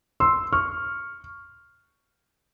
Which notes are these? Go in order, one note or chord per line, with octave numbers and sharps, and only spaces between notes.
C6 E6
C#6 F6